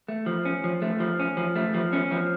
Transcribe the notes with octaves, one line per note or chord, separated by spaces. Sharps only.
A3
F3
C#4
F3
A3
F3
C#4
F3
A3
F3
C#4
F3